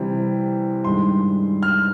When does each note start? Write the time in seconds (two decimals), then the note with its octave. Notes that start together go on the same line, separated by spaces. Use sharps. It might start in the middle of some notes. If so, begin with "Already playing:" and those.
Already playing: C3 E3 G3 C4
0.85 G2 D#3 G#3 C6
1.63 F6